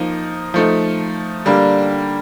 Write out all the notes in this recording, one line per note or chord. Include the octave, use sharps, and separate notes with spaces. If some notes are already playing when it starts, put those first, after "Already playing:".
Already playing: F3 A#3 D#4
F3 A3 D#4
D3 G3 A#3